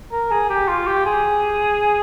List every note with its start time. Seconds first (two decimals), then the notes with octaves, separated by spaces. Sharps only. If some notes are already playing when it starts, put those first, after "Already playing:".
0.12 A#4
0.31 G#4
0.50 G4
0.68 F4
0.87 G4
1.06 G#4